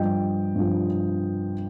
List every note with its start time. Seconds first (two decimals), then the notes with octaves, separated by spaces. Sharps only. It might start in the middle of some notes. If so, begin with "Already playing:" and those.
Already playing: G2 F3 D#5 G5
0.55 G2 F3